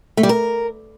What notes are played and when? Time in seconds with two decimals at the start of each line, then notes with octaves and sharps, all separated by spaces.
0.17 A3
0.23 G3
0.29 A#4